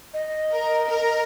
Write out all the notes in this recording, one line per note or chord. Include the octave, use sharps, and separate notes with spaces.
D#5
A#4
A#4